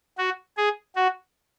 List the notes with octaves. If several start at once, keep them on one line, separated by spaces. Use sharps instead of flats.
F#4
G#4
F#4